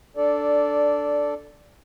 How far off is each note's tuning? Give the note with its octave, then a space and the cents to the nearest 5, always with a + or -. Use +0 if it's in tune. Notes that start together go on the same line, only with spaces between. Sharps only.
D4 +0 A4 +0 D5 -10